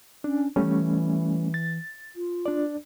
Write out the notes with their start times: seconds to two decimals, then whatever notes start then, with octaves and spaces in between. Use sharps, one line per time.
0.24 C#4 D4
0.56 E3 G3 A3 C#4
1.54 A6
2.15 F4
2.46 D4 D5